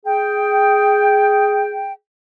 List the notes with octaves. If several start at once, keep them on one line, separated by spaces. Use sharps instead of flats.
G#4 G5